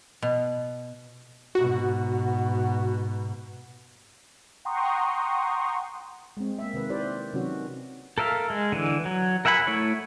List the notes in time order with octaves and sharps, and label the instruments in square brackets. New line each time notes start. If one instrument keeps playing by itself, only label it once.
[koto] B2
[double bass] G#2 B2 [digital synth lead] F#4
[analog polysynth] F#5 G5 A#5 C6 C#6 D#6
[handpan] G#3 C4
A#3 E5
C3 D#3 B4
E4 G4 B4 C5 D5
C3 D#3 F#3 C#4 F#4
[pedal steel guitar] A4 A#4 E5 F5
G#3
D3 E3
F#3
A#4 E5 F#5 G#5 B5
A3 E4 C#5